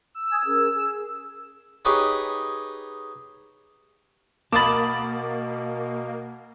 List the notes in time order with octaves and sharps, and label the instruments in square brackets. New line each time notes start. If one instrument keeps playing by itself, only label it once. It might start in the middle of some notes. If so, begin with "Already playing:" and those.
[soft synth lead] E6
[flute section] G#5 D#6 G#6
C#4 G#4 A#4
G#4
[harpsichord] D#4 G4 G#4 B4 C#5
[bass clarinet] B2 [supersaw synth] A#3 [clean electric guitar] A5 B5 [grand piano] D6 D#6 A6